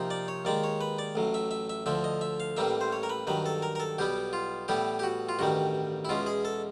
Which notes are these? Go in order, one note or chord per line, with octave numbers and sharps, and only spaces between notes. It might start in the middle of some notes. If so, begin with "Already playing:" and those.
Already playing: C3 F3 A#3 D#4
D5
C#5
D#2 D#3 G#3 D5
C#5
B4
D5
A1 A2 F#3
E5
E5
E5
D2 D3 F3 E5
D#5
E5
F5
A1 A2 E3 G3 A#3 E5
C5
C#5
A#4
B4
G2 D#3 F#3 B4
A4
A#4
A#4
A4
B1 B2 G3 B3 G4
F4
A2 E3 G3 B3 G4
G4
F#4
F4
A1 G2 D#3 G3 F#4
E4
E2 B2 G#3 C#4 F4
G#4
A4